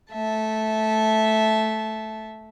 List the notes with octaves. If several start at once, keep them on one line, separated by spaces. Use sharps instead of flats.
A3 E5 A5